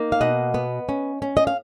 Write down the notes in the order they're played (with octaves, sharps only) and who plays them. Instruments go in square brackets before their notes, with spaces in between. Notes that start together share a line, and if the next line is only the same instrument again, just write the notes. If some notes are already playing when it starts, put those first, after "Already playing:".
Already playing: [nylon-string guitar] A#3 D#4
F5
B2 D#5 F#5
B3
C#4
C#4
D#5
F5